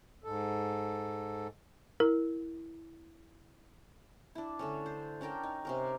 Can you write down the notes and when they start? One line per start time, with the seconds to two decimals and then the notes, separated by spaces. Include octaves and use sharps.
0.24 G#2 A4
2.00 E4 A#4
4.35 D4 E4
4.59 D3 A3 C#4
4.86 C5
5.21 C#4 D4 A#4 G5
5.43 D#4
5.65 C3 C#4 A#4